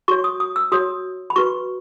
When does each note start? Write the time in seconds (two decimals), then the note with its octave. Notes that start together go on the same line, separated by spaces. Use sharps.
0.08 F#4 C#5 C#6
0.24 D#6
0.40 D#6
0.56 E6
0.72 F#4 C#5 D#6
1.30 B5
1.36 F#4 B4 C#6